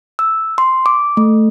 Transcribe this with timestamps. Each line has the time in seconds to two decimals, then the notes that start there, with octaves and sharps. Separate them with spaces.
0.19 E6
0.58 C6
0.86 D6
1.17 A3